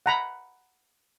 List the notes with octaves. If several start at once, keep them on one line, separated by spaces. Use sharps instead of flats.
F#5 A#5 B5